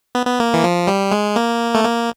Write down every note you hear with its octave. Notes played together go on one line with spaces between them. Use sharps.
B3
B3
A#3
E3
F3
G3
G#3
A#3
A3
A#3